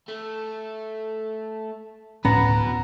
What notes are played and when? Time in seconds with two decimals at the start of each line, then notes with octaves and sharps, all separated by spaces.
0.08 A3
2.25 D1 A2 B3 C#4 F#4 B4 A#5